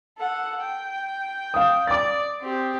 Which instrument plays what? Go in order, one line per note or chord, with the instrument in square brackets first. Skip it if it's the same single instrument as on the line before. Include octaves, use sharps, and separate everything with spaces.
[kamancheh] A4 F#5
G5
[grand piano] F5 D#6
[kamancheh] D5 [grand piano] D6 A6
[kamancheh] C4 G4